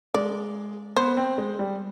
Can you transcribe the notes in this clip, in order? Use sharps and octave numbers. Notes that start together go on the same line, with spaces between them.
G#3 D5
B3 C5
C4
G#3
G3